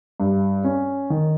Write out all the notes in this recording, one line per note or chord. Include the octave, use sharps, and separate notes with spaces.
G2
C#4
D#3